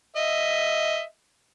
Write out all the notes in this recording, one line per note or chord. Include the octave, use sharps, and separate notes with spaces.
D#5 E5